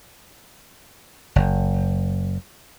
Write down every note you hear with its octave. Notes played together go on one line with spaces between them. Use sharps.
F#1